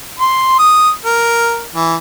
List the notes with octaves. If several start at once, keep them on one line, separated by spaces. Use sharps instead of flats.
C6
D#6
A#4
E3